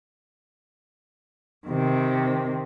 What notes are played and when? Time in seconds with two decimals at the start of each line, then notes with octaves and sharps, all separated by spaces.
1.68 C3 D#3